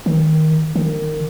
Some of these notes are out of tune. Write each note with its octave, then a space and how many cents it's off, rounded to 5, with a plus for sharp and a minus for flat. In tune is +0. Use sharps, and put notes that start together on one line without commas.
D#3 +10
D#3 -20